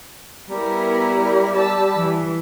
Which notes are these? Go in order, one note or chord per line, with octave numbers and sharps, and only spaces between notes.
G3 B3 E4 A#4
A5 E6
E3